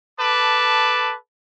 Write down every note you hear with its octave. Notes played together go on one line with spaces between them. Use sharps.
A4 B4 A5 D6